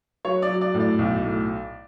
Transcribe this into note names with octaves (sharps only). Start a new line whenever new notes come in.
F#3 C#5
D5
F#3
D5
A2
D5
B1
A2